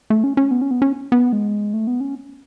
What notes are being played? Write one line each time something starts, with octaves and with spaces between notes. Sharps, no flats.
A3
C#4
C#4
B3
C#4
B3
C#4
B3
G#3
A3
B3
C#4